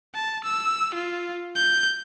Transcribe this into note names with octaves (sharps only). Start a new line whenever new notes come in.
A5
E6
F4
G6